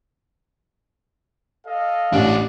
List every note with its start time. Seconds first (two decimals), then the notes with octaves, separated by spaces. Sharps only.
1.67 A4 D#5 F5
2.12 A1 E2 D4